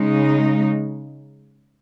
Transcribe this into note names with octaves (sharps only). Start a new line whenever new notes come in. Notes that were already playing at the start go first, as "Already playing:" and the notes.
Already playing: C#3 G#3 D#4